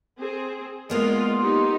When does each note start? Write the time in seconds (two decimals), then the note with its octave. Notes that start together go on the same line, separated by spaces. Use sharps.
0.19 C4 G#4
0.90 G#3 A#3 B3 F4 D5 C6 D#6
1.42 D#4 G4